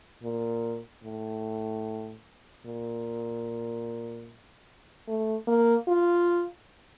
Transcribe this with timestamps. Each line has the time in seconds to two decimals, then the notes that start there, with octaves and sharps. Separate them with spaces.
0.23 A#2
1.04 A2
2.66 A#2
5.07 A3
5.48 A#3
5.88 F4